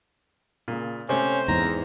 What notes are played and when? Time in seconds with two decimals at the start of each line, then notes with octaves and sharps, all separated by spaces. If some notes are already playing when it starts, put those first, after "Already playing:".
0.68 A#2 C#3
1.09 C3 A3 C#4 C5
1.48 E2 G#2 A#5